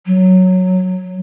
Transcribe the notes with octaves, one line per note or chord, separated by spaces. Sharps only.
F#3